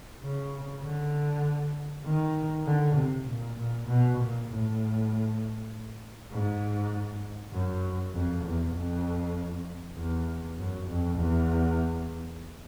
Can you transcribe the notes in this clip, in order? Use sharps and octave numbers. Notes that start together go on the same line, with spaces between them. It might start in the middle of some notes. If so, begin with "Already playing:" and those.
C#3
D3
D#3
D3
C3
A#2
A#2
B2
A#2
A2
G#2
F#2
F2
E2
F2
E2
F#2
F2
E2